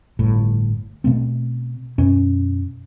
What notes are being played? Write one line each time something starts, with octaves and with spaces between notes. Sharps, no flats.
G1 A2
B2 A3 C4
F#2 B2 C#4